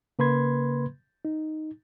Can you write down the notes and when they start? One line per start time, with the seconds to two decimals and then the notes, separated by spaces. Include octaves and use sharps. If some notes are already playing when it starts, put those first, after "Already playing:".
0.19 C#3 A#3 B4 B5 C6 G#6
1.25 D#4